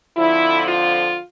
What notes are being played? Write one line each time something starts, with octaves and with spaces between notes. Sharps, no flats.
F2 D3 F3 E4
F4